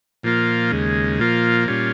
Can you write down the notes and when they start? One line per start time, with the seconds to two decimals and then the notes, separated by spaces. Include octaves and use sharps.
0.23 A#2 F3 A#3 F4
0.72 D#2 C#3 G#3
1.19 A#2 F3 A#3 F4
1.68 A#2 G3 C#4 F4